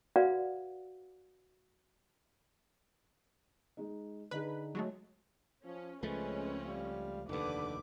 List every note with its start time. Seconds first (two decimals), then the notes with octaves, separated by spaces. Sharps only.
0.16 F#4 B4 D5 F5 F#5 A#5
3.77 G#3 D#4
4.31 D3 D#4 G#4 B4 B5
4.75 F#3 G#3 A3
5.65 F3 C#4
6.03 C#2 F3 G#3 A3 C4 C#4 B4
6.66 G3 F5
7.29 F1 D#2 D3 B4 D6